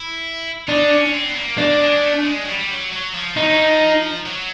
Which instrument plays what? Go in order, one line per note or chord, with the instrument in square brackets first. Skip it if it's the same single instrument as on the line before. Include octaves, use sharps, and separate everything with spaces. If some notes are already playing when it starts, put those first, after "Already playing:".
Already playing: [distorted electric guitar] E4
[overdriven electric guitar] D4 [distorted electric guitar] D#4
[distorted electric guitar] C#4
C4
B3
A#3
[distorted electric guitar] A#3 [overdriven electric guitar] D4
[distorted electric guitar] G#3
A3
G#3
F#3
G3
G3
F#3
F#3
F3
[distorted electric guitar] F3 [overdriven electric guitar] D#4
[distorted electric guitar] F#3
F3
F#3